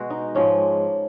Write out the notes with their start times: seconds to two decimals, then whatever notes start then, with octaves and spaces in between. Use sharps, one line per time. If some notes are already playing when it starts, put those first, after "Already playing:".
Already playing: B2 G#3 F#4
0.10 D#4
0.35 G#2 F3 G#3 C#4